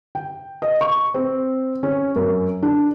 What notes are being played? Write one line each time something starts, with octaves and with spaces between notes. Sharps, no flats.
G5
D#5
C#6
C4
C#4
F#2
D4